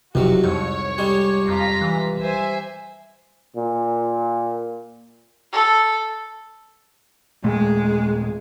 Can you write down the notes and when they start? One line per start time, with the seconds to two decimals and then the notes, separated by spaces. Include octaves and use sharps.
0.15 D#1 C2 F2 C3 F#3 F#4
0.44 F2 G#2 C#5
0.98 G3 G#3 D4
1.48 F2 F4 A#5 B6
1.81 E3
2.20 C5 E5 G#5
3.56 A#2
5.52 A4
7.44 D#1 A#2 G#3 A3